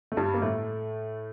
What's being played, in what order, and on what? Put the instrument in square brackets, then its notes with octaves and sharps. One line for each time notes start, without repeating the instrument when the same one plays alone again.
[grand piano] A3
G2 G3
A#3
A2 A3